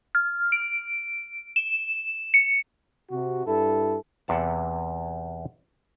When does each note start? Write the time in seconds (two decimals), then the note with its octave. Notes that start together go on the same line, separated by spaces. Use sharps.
0.15 F6
0.52 D7
1.56 E7
2.34 C#7
3.10 C3 F#4
3.47 G2 E4 A4
4.28 E2 C3 F#5 A5